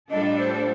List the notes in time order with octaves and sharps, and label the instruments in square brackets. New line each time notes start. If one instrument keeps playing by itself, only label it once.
[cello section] A2 G3 D4 F4 A4 [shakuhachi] D#5
[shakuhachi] D#5
C5
C5